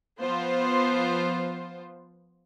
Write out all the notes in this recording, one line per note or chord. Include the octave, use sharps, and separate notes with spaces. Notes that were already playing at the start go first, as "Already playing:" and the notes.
F3 B3 F4 C5